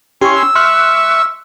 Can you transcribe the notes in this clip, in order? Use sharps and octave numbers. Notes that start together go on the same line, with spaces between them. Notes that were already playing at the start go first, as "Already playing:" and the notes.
C#4 E4 G4 C6 C#6
E6
E5 C6 C#6 F6 F#6